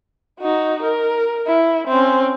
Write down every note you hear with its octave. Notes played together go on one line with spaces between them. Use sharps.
D#4 F#4
A#4
E4
C4 C#4